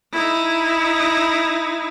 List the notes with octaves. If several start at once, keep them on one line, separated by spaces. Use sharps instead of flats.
D#4 E4